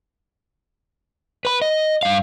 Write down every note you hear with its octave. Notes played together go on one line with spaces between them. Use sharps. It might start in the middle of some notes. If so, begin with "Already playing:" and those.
B4 B5
D#5
G2 F5